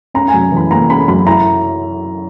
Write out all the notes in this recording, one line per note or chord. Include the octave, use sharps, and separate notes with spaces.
C#4 A#5
G#5
F#2
E3
B5
A#3 A#5
C#4 B5
F#2 B5
E4 A#5